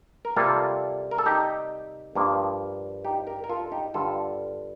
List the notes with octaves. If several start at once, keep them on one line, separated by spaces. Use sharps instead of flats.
A#4
C3 G3 A#3 F4 A4
A#4
A4
D#4 G4
G2 F3 A#3
D#4 G4
G4 A#4
A#4
F4 A4
D#4 G4
G2 D3 G3 F4 A4